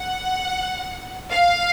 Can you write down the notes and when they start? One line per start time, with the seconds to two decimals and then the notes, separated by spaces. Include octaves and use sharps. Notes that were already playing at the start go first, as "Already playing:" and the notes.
Already playing: F#5
1.31 F5